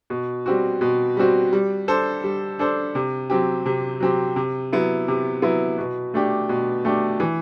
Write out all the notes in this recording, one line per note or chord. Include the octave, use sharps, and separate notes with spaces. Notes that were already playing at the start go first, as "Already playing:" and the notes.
B2
G3 C4 F#4
B2
G3 C4 F#4
G3
D4 A4 C5
G3
D4 A4 C5
C3
F#3 C4 G4
C3
F#3 C4 G4
C3
F#3 B3 E4
C3
F#3 B3 E4
B2
A3 D4 G4
B2
A3 D4 G4
E3